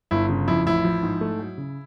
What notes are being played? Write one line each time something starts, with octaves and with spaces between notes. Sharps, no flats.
G1 E4
C#3
F2 E4
A1 E4
F3
G#2
A3
F#3
C#3